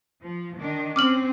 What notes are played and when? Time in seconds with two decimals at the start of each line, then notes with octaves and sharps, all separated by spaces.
0.22 F3
0.58 D#3 D4
0.96 C4 C#4 D6 F6 F#7